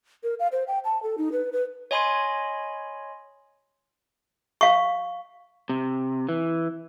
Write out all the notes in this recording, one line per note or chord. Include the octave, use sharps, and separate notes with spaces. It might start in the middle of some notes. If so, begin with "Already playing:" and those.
A#4
F5
C5
G5
A5
A4
D#4
B4
B4
C#5 D#5 G#5 B5 C6 G#6
F5 C#6
C3
E3